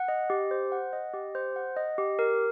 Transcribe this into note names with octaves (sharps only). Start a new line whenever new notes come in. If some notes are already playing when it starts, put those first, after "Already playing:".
Already playing: F#5
D#5
G4
C5
F#5
D#5
G4
C5
F#5
D#5
G4
A#4